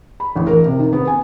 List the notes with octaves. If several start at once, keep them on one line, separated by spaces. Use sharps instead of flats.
B5
A1
A#4
C3
D#3
B3
G#5